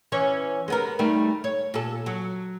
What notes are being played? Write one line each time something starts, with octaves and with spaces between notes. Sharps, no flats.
E3 C#4 C#5
G#3 B3 A#4
D#3 G3 A3
C#5
A#2 A4
F#3